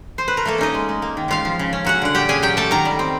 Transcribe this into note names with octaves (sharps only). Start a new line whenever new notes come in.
C5
B4
A#4
A3 A#3 A4
C#4 D#4 D#5
G#3
G#3
A#3
D#3
C#3 F4 F5
F3
C#3
C#4
F#3 F#4 F#5
D3 F#5
A#2 G4 G5
C#4 G#4 G#5
F#3 G4 G5
A3 A4 A5
D#3 A#4 A#5
G3
C4